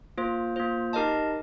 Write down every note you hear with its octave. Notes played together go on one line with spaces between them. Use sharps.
A#3 F4 C5
A#3 F4 C5
D#4 G4 A#4 D#5 A5